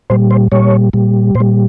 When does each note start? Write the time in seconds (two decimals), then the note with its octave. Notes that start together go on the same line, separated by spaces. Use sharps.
0.10 A#2 G3 C5
0.31 C5
0.52 A#2 G3 C#5
0.93 A#2 G3
1.35 A#2 C5
1.40 G3